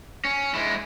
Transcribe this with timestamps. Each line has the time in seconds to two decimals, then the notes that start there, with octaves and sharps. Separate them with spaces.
0.25 C#4
0.55 G#3 E4